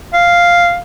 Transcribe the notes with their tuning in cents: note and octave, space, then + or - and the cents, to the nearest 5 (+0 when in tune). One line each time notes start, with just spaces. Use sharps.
F5 -5